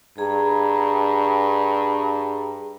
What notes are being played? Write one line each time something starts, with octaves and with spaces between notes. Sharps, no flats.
G2 G#4 A#5